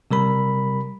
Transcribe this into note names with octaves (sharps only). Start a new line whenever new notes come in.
C3 G3 A#4 B5